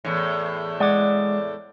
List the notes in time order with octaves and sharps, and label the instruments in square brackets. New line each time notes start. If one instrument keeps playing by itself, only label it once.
[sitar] E2 A2
[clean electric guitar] G#3 D#5 F#5 [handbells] D5 D6